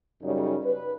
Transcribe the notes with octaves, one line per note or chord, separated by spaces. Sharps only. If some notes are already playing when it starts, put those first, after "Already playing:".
F#2 C#3 G3 C#4 D#4
B4